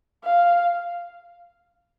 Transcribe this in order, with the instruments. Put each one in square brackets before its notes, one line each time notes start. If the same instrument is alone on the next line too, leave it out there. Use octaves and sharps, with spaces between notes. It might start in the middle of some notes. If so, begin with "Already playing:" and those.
[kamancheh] F5